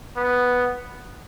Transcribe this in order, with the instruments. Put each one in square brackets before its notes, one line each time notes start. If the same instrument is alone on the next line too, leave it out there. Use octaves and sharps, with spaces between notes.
[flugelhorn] B3